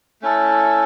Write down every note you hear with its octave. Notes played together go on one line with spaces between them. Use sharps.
A3 C#4 E4 A4